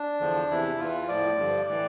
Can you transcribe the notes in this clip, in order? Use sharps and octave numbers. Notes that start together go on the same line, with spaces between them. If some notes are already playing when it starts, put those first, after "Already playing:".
Already playing: D4
E2 D3 F3
E2 C3 E3 E4
E2 E3 F4
A2 F3 D5
G2 D3 F3
A2 E3 D5